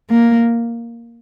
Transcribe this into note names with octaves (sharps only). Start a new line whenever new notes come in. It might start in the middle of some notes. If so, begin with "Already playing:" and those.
A#3